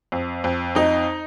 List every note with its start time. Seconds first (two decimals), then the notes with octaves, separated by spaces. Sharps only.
0.12 F2
0.44 F2
0.75 F2 D#4